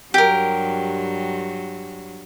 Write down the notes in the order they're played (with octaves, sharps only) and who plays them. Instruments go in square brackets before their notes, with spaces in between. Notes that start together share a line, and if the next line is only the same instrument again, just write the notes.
[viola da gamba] G2 F#3 [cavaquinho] G4 A#4